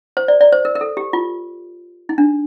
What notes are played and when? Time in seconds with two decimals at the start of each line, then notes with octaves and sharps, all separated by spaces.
0.17 C5
0.28 D5
0.41 D5
0.52 C5
0.65 A#4
0.75 A#4
0.81 A4
0.97 G4
1.13 F4
2.09 D#4
2.18 D4